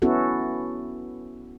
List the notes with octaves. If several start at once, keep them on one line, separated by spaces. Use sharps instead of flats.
B3 C#4 E4 F#4 A4